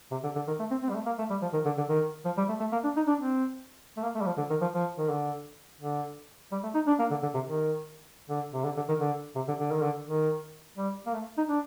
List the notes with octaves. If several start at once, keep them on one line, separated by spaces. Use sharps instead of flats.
C3
D3
D3
D#3
A3
C4
C4
G3
A3
A#3
A3
G3
F3
D#3
D3
D3
D#3
F3
G3
A3
A3
A#3
D4
D#4
D4
C4
A3
A#3
A3
G3
F3
D3
D#3
F3
F3
D#3
D3
D3
G3
A3
D#4
D4
A#3
D3
D3
C3
D#3
D3
C3
D3
D3
D#3
D3
C3
D3
D3
D#3
D3
D#3
G3
A#3
A3
D#4
D4